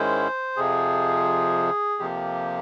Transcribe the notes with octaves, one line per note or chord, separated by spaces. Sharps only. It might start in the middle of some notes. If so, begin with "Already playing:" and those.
Already playing: G#2 D#3 G#3 C#4 E4 C5
F2 C3 F3 G#4
F2 C3 F3 A#3 G4